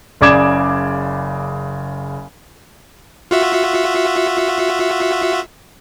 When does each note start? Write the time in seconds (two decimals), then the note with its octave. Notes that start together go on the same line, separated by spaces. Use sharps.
0.21 F#1 C#3 D5 D6 G#6 E7
3.31 F4 F#4 E5